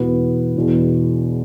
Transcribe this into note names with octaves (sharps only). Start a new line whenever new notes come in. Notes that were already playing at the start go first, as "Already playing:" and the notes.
Already playing: E1 E2 E3 B3 F#4
E1 E2 B2 B3